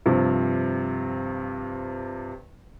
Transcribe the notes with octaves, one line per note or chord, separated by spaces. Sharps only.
G2 C3 F3